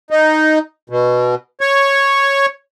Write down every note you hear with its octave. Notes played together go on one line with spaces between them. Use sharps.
D#4
B2
C#5